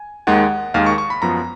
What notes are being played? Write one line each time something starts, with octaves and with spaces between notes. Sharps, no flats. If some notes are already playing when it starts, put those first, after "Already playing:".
Already playing: G#5
D#2 D#3 G#3 F#5
D#2 D#3 G#3 F5
C#6
C#6
B5
F#2 F3 B3 A#5